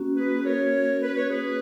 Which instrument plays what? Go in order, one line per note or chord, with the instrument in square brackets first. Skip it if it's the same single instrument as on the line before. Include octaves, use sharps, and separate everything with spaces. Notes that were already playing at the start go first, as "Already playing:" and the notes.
Already playing: [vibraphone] A#3 C#4 F#4
[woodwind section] G#4 B4
A#4 C#5
B4
C#5
G#4 B4